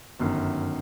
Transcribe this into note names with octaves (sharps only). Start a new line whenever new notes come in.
G1 F#2 D#3